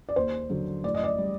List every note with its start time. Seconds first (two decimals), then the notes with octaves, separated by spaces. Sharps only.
0.09 D5
0.16 D#2 C5
0.50 D3 F#3
0.84 A2 D5
0.94 D#5
1.04 D5
1.18 G3